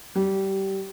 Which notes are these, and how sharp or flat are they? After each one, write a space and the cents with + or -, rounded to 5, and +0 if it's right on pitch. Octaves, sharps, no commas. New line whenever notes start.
G3 -20